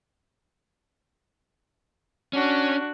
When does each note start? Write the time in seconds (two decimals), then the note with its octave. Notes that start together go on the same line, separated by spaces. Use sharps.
2.33 C#4 D4 F#4